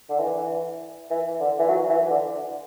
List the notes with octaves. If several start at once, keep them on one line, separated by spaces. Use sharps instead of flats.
D3
E3
E3
D3
E3
F#3
E3
D3